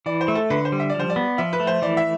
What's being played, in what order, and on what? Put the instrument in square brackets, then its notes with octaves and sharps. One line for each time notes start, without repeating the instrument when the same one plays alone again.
[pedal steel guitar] E3 [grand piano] D5
[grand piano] C5
[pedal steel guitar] A3
[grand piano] A4
[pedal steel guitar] D3 [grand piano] B4
[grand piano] C5
[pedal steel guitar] G3
[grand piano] E5
[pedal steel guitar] F3 [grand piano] D5
[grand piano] C5
D5
[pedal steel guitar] B3
[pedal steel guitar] F3 [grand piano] E5
[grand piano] B4
[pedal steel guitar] A3
[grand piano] C5
[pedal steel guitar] E3 [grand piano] D5
[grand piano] E5